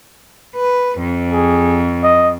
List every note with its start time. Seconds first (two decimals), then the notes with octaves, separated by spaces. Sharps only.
0.56 B4
0.99 F2
1.32 G#4
2.03 D#5